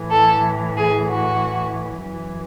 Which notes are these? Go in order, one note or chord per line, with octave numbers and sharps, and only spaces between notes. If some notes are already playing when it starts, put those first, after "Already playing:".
Already playing: A2 E3
A4
G#4
F#4
F#2 E3